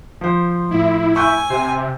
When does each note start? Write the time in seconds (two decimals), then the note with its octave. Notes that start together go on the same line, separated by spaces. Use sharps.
0.21 F3 C5
0.71 A2 E4
1.16 G#5 C#6 E6 G6
1.50 C3 C5